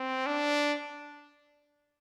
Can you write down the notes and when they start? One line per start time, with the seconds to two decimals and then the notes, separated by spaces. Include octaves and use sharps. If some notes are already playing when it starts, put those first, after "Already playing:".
Already playing: C4
0.26 D4